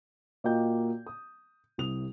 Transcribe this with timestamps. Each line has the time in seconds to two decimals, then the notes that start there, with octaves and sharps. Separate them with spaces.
0.44 A#2 A#3 F#4 D#5 G5 G6
1.07 D#6
1.78 C2 C3 D#6 F7